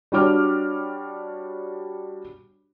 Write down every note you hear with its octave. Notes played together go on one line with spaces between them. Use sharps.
G3 D4 F#4 C#5 D6 F6